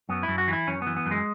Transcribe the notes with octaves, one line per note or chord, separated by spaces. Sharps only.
F#2 B3
E4
F#2
F#4
E3 E4
F#2 C#4
E3 B3
B3
F#2
G#3